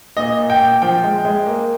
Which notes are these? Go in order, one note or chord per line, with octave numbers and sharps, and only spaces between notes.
A#2 D#5
A#2
G5
A#2
F3 G5
G#3
G#3
A#3